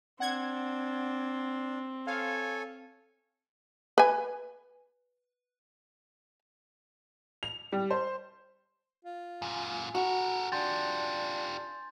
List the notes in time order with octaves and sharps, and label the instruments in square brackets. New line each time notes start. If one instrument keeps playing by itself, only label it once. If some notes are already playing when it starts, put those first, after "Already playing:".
[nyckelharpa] C4 [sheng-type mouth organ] D4 [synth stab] F#5 G#6
[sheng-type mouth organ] A4 C#5 G#5 [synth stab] F5
[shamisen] B4 G#5
[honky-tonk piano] F7
G3
C5
[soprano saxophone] F4
[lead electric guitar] F#2 A#2 [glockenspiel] G#5
[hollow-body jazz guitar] F#4 [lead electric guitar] A4 A#4
[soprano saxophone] D4 [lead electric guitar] F4 G4 [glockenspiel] C6 G6 A6